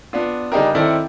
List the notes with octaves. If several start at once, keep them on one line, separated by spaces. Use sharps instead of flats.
B3 D4 F4
C#3 G3 D4 D#4 G4 A#4
D#3 C4 E4 A4 D5